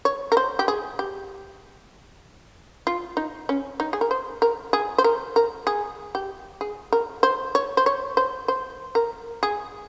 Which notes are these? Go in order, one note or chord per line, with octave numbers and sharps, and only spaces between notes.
C#5
A#4
C5
G4
G#4
G4
F4
D#4
C#4
D#4
G#4
A#4
C5
A#4
G#4
C5
A#4
A#4
G#4
G4
G#4
A#4
C5
C#5
C5
C#5
C5
C5
A#4
G#4